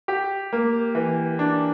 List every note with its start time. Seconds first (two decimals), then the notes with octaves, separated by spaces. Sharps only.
0.08 G4
0.53 A#3
0.95 E3
1.39 D4